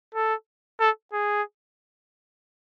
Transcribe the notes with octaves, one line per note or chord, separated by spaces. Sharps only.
A4
A4
G#4